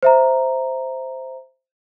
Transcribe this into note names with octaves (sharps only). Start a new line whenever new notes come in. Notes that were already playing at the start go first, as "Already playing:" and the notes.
C5 E5 A#5